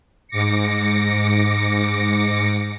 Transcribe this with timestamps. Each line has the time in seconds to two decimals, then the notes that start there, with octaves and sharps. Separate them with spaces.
0.28 G#2 D6 A#6 C#7